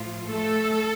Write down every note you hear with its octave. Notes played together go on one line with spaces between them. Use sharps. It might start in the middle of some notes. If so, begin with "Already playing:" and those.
Already playing: A2 F3 F4
A3 A4